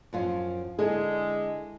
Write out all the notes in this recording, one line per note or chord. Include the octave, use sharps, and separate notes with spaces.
F#2 F3 F4
D3 G#3 E4 G#4 A4